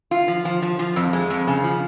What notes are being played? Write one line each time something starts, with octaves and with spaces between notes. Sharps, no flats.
F4
F3
F3
F3
F3
F2
G#3
F2
C#3
F3